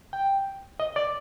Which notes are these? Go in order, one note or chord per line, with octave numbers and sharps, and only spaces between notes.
G5
D#5
D5